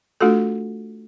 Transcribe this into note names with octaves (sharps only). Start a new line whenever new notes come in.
A3 D4 F4 F#4 A4